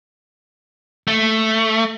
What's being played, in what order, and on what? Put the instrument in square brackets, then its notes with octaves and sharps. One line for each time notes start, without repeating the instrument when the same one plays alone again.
[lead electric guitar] A3